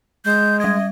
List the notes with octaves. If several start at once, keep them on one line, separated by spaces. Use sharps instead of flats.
G#3 G6
G3 D#5 G#6